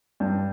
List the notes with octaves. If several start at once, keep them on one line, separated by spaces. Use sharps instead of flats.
G2